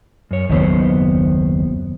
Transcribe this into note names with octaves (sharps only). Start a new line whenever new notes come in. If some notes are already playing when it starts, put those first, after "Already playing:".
F#2 C#5
F#1 D#2 D#3 F#3 B3 C5